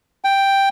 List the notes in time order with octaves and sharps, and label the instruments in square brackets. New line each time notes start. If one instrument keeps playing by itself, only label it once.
[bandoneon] G5